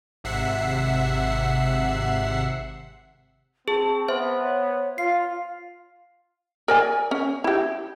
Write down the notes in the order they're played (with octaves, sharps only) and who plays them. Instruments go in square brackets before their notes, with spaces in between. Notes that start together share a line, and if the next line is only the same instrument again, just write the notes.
[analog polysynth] G#1 C3 E5 F#5 C7
[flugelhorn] C4 [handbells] G#4 [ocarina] A5
[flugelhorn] B3 [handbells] C5 E5 [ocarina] C6
[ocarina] C#5
[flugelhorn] F4 [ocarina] F5 [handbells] C7
[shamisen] A#4 D5 G#5
C#4
E4 G4